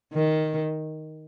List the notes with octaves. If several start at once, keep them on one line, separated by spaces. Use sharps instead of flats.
D#3